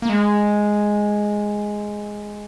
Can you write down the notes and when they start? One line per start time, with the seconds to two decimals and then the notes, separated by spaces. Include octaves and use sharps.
0.02 A#3
0.09 G#3